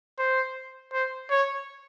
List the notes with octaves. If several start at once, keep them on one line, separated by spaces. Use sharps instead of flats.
C5
C5
C#5